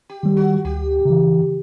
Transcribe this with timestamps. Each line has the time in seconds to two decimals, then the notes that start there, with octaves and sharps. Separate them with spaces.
0.09 G4
0.23 D#3 G3
0.37 F#4
0.65 D2 G4
1.05 C#3 E3